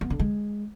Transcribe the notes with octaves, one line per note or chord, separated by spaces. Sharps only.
B3
D3
G#3